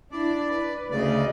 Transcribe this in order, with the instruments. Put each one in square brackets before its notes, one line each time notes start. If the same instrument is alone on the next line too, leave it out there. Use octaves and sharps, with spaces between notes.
[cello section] D4 E4 [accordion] D5
[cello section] B4
[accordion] D2 C#3 D5 [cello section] A3 D#5